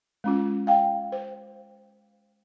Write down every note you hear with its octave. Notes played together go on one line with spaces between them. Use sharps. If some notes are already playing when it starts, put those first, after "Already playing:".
G#3 C#4 F4
F5 G5
C5